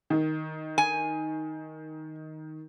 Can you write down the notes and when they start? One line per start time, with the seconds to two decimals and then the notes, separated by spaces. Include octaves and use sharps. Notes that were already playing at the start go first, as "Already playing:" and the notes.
0.10 D#3
0.78 G#5